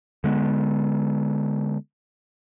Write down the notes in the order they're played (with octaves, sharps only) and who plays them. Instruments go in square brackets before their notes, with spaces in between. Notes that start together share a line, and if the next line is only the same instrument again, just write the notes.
[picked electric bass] D3 G#3 B3